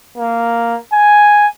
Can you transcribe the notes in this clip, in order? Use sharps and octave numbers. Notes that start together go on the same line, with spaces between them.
A#3
G#5